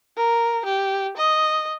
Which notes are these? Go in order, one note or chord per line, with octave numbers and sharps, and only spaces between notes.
A#4
G4
D#5